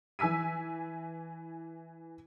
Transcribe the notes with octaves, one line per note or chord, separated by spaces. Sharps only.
E3 G#5 E6 B6 D#7